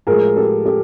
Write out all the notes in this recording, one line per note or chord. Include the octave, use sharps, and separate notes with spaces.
A2 F3 G#3 G#4 A#4
G4 A4
G4 A4